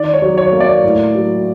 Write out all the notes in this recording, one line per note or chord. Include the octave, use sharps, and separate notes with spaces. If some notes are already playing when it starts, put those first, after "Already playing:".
Already playing: D#3 D5
C#5
F#3
C#5
A#3
D5
A2
F#3